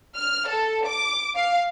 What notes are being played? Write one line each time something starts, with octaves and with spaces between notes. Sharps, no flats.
F6
A4
D6
F5